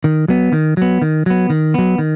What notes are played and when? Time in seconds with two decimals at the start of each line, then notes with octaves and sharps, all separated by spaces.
0.04 D#3
0.28 F#3 B3
0.53 D#3
0.77 F#3 B3
1.02 D#3
1.26 F#3 B3
1.50 D#3
1.74 F#3 B3
1.98 D#3